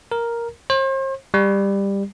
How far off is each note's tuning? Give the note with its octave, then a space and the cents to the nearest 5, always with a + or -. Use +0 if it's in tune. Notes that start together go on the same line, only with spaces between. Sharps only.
A#4 +5
C5 +40
G3 +15